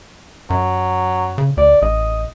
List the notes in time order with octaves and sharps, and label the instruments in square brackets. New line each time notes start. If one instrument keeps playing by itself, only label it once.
[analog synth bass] F#2 [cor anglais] F#3
[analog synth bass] C#3
[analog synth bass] D2 [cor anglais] D5
[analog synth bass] A1 [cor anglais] D#5